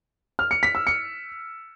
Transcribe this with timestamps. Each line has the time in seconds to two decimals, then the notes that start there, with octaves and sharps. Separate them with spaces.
0.39 F6
0.51 C#7
0.63 B6
0.75 E6
0.87 C#7